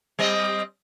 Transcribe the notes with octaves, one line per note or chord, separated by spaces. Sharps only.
G3 C4 D#5